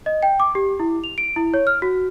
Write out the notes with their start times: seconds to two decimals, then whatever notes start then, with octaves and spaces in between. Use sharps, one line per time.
0.06 D#5
0.23 G5
0.40 D6
0.55 G4
0.80 E4
1.04 F7
1.18 D7
1.36 E4
1.54 C#5
1.67 F6
1.82 F#4